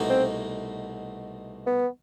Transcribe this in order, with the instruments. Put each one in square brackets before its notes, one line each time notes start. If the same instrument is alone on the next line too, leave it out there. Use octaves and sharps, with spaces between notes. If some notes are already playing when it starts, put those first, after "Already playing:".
Already playing: [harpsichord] C2 B2 A3 D#4
[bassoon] C4
B3